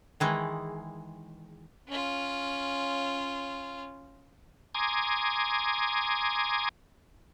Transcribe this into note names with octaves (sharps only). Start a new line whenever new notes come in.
D#3 E3 G#3
C#4 F4
G#5 A#5 C6 D6 D#6 G#6